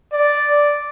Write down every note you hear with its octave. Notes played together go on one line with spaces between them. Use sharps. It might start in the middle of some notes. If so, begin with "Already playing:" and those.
D5